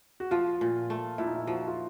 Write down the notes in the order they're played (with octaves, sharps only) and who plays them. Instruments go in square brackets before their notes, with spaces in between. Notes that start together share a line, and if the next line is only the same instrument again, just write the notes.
[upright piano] F#4
[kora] F3 [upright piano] F4
[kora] A#2
A3
[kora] A#2 [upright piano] E4
[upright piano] D#4
E4
[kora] F3 [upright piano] F#4
[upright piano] F4